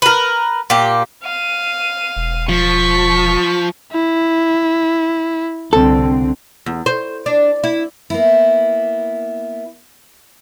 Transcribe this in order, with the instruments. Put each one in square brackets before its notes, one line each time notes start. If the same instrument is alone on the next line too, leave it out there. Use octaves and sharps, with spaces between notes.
[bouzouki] A#4 B4
A#2 G4
[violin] F5 D#7
[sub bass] E1
[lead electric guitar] F3 [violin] C#6 B6
[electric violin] E4
[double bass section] C2 D3 C4 [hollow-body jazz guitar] A4
[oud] E2
C5
D4
E4
[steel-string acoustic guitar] A#3 B3 E4